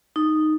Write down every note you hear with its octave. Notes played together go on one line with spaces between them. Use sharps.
D#4